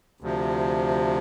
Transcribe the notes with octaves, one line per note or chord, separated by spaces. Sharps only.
D2 C3 F3